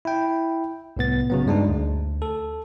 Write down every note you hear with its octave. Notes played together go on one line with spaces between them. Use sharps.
E4 G5
C2 A2 B3 A6
C#3 F#3 B3
G2 G#3 D4 D#4
D2
A4